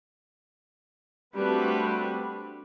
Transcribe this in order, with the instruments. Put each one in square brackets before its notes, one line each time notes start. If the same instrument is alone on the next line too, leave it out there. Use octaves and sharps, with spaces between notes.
[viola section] G3 A3 C4 D4 F#4 B4